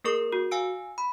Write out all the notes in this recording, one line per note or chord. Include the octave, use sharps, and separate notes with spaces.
A#3 G#4 A#4 C#6
F#4
F5 G#5 E6 D7
B5